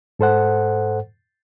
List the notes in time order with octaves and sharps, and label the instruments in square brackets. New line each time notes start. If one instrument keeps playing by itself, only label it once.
[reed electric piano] G#2 A4 C5 F#5